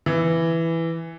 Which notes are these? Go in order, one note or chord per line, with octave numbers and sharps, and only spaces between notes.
E3